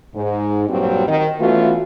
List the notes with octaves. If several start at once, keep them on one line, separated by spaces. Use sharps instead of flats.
G#2
G2 A#2 F#3 G3 C4 F#4
D#3
E3 A3 B3 C#4 F4 F#4